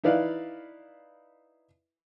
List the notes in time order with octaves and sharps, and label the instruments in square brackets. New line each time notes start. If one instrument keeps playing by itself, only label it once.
[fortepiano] D#4 E4 B4 D5 F5